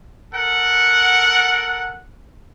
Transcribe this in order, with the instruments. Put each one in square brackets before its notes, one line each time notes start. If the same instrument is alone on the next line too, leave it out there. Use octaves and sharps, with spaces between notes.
[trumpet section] A4 A#4 F#5